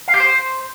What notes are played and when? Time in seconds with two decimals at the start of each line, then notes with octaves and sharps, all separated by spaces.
0.08 F5
0.14 G4
0.20 C5